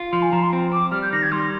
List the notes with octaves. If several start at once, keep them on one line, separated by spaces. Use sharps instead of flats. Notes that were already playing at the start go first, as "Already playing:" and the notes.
Already playing: F4
F3 C6
G#5
F3 A#5
C6
C4
C4 D6
G3 F6
G6
D#3 A#6
G#6
G3 C6